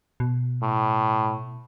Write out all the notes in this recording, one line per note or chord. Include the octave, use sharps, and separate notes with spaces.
B2
A2